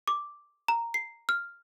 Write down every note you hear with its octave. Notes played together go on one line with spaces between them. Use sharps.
D6
A#5
C7
F6